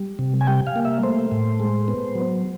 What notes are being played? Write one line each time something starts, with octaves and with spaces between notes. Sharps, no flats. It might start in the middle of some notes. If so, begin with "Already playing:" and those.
Already playing: G3
C3
G#5
G3 G5
F5
A#3
E5
A3 C5
A2
G#3
B3
F#3